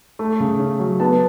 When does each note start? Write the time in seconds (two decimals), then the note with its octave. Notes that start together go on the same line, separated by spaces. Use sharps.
0.19 A3
0.40 C#3
0.59 C#4
0.80 F#3
1.00 B3 A5